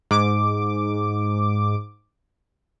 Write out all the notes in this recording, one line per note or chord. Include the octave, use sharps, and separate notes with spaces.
G#2 D6